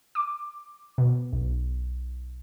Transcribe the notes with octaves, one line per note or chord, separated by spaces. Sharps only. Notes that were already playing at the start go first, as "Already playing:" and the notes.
D6
B2
B1